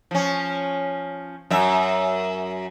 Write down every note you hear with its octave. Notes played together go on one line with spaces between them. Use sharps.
F3 C#4
F#2 E5